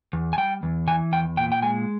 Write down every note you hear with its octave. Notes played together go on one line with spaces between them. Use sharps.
E2
G#5
G3 G5
E2
E3 G#5
E2 G5
A#2 G5
G5
G#3 G#5